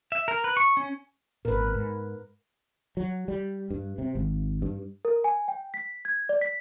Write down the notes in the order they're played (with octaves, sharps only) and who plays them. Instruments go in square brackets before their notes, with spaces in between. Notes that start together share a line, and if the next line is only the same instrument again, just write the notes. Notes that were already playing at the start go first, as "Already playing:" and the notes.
[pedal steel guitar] E5
A#4
B4
C#6
C#4
[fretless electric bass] G#1 A#2 [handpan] A#4 B4
[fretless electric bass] G#2
F#3
G3
G2
C3
G#1
G2
[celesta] A#4
G#5
G5
B6
G#6
D5
B6